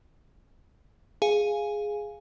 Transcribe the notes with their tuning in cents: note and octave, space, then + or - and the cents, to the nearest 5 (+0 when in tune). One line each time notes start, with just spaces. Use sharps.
G#4 +0 F5 +0 G#5 +0